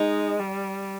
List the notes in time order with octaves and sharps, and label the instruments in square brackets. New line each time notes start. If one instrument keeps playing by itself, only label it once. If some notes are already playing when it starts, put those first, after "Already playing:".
Already playing: [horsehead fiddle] G#3 [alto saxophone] D#4
[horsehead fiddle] G3